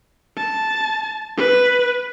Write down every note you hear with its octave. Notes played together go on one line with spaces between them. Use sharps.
A5
B4